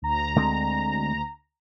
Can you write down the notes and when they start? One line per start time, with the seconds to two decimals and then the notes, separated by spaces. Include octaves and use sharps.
0.02 D2 A#5
0.36 D3 G#3 C4